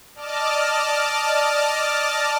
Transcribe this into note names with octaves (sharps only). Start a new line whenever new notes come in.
D5 D#5 A5 D6 F6